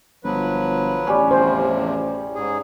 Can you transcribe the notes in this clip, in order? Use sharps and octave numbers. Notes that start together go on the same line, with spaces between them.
G1 F3 F#3 B4
A1 G3 C#4
E2 C3 F3 C5
G#2 G#4